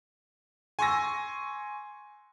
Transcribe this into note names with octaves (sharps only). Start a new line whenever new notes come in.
G#5 C6 C#6 E6 A#6